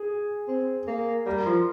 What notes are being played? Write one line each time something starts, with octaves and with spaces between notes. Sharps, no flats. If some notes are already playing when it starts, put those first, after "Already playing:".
Already playing: G#4
C4
A#3
G3 A#4
F3